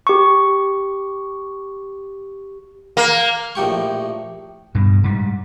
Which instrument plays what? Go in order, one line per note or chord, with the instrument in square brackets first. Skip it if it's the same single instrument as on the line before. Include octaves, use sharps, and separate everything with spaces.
[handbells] G4 C#6
[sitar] A#3
[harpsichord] A#1 A2 G4 C#6
[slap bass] G2 B2
G#2 G3